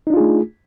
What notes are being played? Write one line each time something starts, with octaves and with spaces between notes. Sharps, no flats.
A3 D4 D#4 F4 G#4